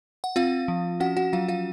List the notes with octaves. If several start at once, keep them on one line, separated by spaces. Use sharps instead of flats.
F#5
C4 F4 F5
F3
C#4 F#4 F#5
F#4 F#5
F#3 F4 F5
F4 F5